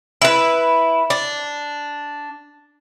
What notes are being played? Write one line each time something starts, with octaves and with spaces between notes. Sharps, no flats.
E4 B4
D4